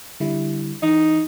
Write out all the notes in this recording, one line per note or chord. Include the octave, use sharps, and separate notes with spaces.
D3 G3 E4
E3 D#4